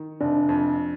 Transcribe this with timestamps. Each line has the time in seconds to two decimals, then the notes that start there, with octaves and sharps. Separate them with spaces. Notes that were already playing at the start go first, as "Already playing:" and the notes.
Already playing: D#3
0.21 F1 D4
0.49 F2